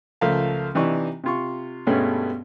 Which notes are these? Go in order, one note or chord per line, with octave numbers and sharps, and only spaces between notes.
C#2 F3 A3 A#4 F5
C3 E3 D4 D#4 C#6
C3 F4 C#6
G2 B2 G#3 A3 B3 C#4